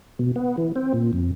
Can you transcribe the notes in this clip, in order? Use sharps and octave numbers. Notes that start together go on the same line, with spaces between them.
B2
B3
E3
C4
A#2
F2